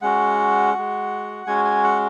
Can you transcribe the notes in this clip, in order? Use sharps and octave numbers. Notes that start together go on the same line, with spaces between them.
G#3 C#4 F#4 F#5
G#3 F#4
G#3 C#4 F#4 G#5
G#5
F#5